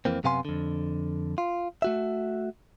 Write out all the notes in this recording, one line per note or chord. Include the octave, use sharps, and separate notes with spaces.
F2 E3 A#3 C4
F#2 C3 B3 F5 G#5 C6
F2 D3
F4
A3 F#4 E5